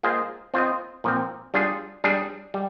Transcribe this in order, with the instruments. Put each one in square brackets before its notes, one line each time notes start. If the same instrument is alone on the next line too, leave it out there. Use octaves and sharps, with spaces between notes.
[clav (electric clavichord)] A#3 F4 G#4 C5 D#5
C4 F4 C5 D#5
A#2 F3 C4
G3 D4 F4 G#4
G3 D4 G#4
G3